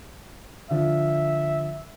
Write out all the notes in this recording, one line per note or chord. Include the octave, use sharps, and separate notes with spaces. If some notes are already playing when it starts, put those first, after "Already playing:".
D3 F3 E5